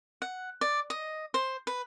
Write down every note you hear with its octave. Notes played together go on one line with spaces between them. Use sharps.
F#5
D5
D#5
C5
B4